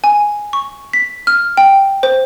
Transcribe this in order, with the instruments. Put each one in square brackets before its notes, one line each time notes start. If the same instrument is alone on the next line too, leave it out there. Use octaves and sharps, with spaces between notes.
[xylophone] G#5
C#6
B6
F6
G5
C5